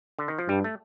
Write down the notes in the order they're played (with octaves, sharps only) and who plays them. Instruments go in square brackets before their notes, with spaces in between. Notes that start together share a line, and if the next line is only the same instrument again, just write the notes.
[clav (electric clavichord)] D3
D#3
F3
[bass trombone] G2 [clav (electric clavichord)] G3
[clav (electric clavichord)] A3